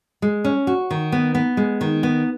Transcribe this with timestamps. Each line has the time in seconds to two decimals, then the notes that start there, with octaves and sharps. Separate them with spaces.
0.22 G#3
0.44 C#4
0.67 F#4
0.91 D#3
1.12 B3
1.35 B3
1.57 G#3
1.81 D#3
2.03 B3